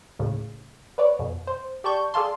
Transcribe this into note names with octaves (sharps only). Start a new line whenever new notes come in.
D#2 A2 C#3
B4 C#5 D5
F2 B2
C5
G4 D5 A5 C#6 G6
G#4 A4 D5 F5 A5 C6